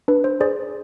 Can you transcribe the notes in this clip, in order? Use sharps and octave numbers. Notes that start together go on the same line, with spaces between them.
D4 B4
C5
G#4 C5 D5